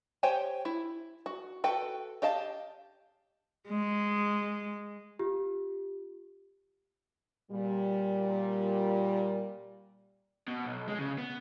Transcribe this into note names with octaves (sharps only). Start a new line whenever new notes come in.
G4 C5 C#5 G5 G#5
E4
F#4
F#4 A4 B4 G5
G4 D#5 F5 A5
G#3
F4 G4
A#2 G3
B2
B1
G#3
C#3
B3